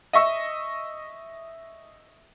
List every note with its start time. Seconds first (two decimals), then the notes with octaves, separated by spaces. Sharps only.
0.13 D#5 E5 C#6 E6